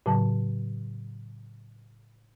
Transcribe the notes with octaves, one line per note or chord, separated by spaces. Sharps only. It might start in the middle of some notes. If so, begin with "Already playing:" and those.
A2 C#3 F#3 A5